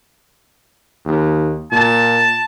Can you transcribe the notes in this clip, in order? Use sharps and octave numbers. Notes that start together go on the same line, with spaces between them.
D#2
A#2 A5